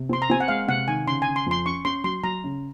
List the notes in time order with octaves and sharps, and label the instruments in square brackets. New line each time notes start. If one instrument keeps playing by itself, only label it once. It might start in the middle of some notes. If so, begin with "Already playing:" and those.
Already playing: [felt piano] C3
[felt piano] C4 [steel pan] C6
[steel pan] A#5
[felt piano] C4 [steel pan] G#5
[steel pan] F#5
[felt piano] G#3 [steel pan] F5
[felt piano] C3 [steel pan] F#5
[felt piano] D#3 [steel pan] G#5
[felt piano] C#3 [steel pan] C6
[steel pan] G#5
[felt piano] C#3
[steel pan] C6
[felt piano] F2 [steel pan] C6
[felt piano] C#4 [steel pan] C#6
[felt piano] C#4 [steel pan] C6
[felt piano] F#3 [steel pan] C6
[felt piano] F#3 [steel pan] A#5
[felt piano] C#3